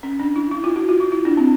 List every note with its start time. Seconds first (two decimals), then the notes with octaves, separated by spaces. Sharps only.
0.03 C#4
0.20 D4
0.36 E4
0.51 E4
0.64 F4
0.76 F#4
0.89 F4
1.00 E4
1.12 E4
1.25 D4
1.37 C4